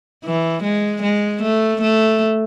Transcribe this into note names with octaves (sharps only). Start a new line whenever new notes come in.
E3
G#3
G#3
A3
A3